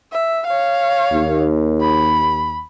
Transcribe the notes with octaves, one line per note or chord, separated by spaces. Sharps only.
E5
C#5 F5
D#2
B5